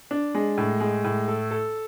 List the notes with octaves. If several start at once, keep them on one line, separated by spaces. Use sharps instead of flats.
D4
G#3
A2
G#3
A2
A4
A4